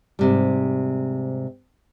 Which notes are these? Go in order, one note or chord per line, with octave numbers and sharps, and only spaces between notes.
G#2 C3 G3